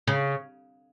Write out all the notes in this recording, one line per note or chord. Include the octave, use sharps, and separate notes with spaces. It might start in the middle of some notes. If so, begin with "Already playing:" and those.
C#3